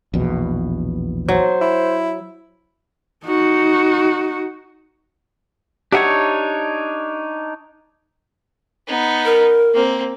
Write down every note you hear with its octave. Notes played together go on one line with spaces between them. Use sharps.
A#1 E2 B2
F#3 C5
E4
D#4 F#4
D4 D#4 G4 C#5 E5 F#5
B3 D#4
A#4
A#3 C4